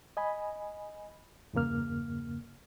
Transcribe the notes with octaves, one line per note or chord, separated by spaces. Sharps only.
D#5 G#5 B5
E2 G2 C#3 A#3 F6